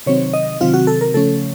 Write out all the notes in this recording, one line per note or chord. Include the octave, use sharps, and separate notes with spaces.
C3 D#3 F#3 C4 C#5
D#5
C3 D#3 F#3 C4 F4
F#4
A4
A#4
C#3 F3 A3 C#4 A4